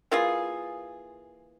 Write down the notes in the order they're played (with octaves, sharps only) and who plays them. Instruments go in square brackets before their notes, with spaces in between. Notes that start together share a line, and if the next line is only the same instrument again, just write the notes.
[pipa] E3 A#3 F4 G#4